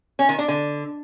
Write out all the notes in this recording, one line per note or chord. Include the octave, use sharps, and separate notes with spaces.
C#4
D#3
D4
D3